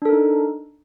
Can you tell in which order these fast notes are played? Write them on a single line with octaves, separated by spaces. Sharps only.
D4 A4 A#4 D#4